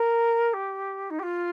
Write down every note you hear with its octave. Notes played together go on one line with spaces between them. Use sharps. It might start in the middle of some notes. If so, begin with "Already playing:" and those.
Already playing: A#4
G4
D#4
G4
F4